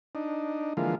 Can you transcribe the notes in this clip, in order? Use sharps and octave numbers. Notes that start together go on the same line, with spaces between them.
D4 D#4
D3 E3 F3 G#3 A#3 F4